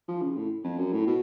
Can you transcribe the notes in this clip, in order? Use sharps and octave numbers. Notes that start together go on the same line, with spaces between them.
F3
C#3
A2
F2
F#2
A2
B2